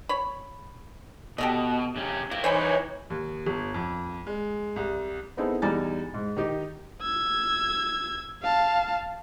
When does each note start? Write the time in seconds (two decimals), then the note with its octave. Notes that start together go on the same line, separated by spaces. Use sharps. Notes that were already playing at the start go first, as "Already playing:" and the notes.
0.09 C#5 B5
1.38 B2 G4 A4 D#5
1.96 C3 C#4
2.31 E4 A#4 F5
2.44 E3 D#4 C5 C#5 G#5 B5
3.10 D#2
3.46 G1
3.74 F2
4.27 G#3
4.76 C2
5.37 B3 C4 D#4 E4 G#4 A4
5.62 E2 G3 D#4 G#5 A#5 A6
6.14 G#2
6.37 D#3 D#4 G4 D#5
7.01 E6 G#6
8.42 F5 A5